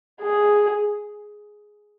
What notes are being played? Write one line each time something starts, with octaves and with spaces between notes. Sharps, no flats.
G#4